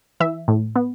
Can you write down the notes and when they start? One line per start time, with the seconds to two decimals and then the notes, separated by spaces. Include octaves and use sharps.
0.20 E3 E5
0.48 A2
0.76 B3